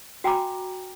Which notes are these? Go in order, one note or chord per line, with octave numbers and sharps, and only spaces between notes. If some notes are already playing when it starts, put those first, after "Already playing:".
F#4 G5 G#5 A#5 B5 D6